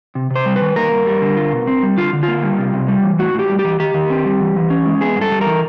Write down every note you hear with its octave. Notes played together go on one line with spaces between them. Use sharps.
C3
C3 C5
G3
B4
D#3
A#3 A#4
G2
G3
D3
F4
B2
C4
G3
D3 F4
D3
A#3 F4
G3
C3
C3
G3
E3
A2 F#4
A2
G4
G3
G4
E3
D#3 G4
D#3
C4
G3
E3
E3
C#4
G#3
B3 G#4
G2
A4
G3
E3 A#4